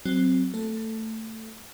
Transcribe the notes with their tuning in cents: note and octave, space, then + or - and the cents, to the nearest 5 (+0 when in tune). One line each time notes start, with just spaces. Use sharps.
F#3 +0 C4 +0
A3 +20 A4 +0